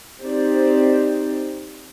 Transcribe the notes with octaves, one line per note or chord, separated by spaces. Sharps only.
C4 D#4 G4 C5 D5